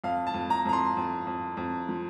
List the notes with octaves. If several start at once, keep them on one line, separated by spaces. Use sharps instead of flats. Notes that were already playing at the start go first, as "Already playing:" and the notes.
F2 F5
A5
F2
A#5
F2 A#5
C6
F2
F2
F2
F3